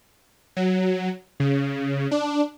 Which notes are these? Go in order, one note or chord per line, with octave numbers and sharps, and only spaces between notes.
F#3
C#3
D4